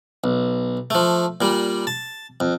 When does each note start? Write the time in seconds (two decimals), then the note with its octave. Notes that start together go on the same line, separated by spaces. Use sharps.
0.24 B1
0.90 F3 A3
1.41 A#2 G3
1.87 A5
2.40 F2